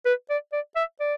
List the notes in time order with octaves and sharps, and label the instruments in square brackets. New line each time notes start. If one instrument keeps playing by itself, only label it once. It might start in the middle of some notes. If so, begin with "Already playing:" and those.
[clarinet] B4
D5
D5
E5
D5